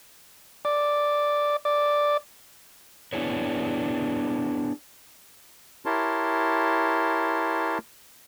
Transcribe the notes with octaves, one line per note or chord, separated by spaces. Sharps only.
D5
D5
B3 D4 E4 G#4 B4 C#5
E4 G4 A#4 C#5 A5 C6